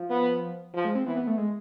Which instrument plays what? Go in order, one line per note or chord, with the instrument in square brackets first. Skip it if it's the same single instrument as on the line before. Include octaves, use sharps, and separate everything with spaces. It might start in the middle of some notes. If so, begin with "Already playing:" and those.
Already playing: [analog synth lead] F3
[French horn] B3
F3
[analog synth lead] G#3
C4
[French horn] E3 [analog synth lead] B3
[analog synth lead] B3
A3
G#3